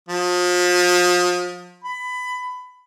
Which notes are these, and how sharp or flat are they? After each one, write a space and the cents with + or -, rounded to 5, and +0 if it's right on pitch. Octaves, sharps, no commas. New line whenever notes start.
F3 +35
B5 +20